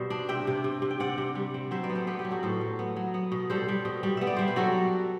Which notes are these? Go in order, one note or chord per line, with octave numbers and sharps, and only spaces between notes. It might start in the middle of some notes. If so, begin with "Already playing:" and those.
Already playing: B2 G3 C5 E5
D4
C3 E5 G5
C3
C3
C3
G5
C3 D5 F#5
C3
G3
C4
F#3 C5 E5
B4 D5
B3
A4 C5
B3 G4 B4
G4
F#3
F#4 A4
A2 A4 C5
F#3
B3
F#3
B3
B2
G3 A4 C5
G3
B2
G3
B3 E5
D5
G3 C5
B4
F#3 F#4 A4